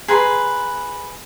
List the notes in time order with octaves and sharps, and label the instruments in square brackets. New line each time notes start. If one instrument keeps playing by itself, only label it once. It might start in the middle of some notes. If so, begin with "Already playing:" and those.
[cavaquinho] G#4 B4 A#5 C6